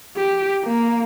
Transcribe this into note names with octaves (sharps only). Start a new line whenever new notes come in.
G4
A#3